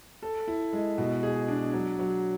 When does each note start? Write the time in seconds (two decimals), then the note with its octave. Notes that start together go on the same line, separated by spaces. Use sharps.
0.22 A4
0.48 E4
0.73 G#3
0.98 B2
1.23 G#4
1.48 D4
1.73 F#3
1.99 F#3